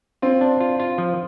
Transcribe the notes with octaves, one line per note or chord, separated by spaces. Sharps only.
C4 F4
D4
F4
F4
F3